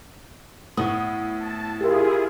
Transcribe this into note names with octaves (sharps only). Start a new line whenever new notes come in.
A2 B3 D#6
A5
E4 F4 G4 G#4 A#4